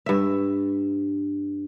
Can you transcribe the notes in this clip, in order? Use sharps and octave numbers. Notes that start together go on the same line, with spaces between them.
G2 E5